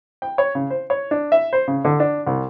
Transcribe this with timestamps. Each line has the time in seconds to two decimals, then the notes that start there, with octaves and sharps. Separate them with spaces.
0.22 G5
0.38 C#5
0.55 C#3
0.70 C5
0.90 C#5
1.11 D4
1.32 E5
1.53 C5
1.68 C#3
1.85 D3
2.00 D4
2.27 C2